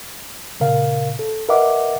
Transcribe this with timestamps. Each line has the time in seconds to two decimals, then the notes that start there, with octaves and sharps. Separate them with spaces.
0.60 A#2 C#3 A#4 F5
1.19 A4
1.49 A#4 B4 D#5 E5 F#5 D6